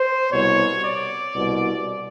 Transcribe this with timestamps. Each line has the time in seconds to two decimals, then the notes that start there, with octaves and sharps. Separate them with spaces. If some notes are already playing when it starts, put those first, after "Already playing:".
Already playing: C5
0.30 C2 B2 C#5
0.82 D5
1.35 C2 B2